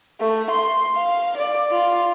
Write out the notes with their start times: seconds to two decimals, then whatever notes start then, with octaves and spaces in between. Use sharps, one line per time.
0.21 A3
0.51 C6
0.96 F5
1.38 D5
1.72 F4